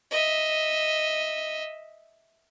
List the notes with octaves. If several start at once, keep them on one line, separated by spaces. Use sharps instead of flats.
D#5 E5